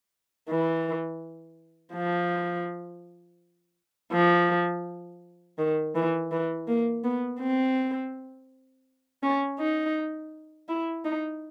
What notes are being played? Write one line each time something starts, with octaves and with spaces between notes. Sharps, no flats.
E3
F3
F3
D#3
E3
E3
A#3
B3
C4
C#4
D#4
E4
D#4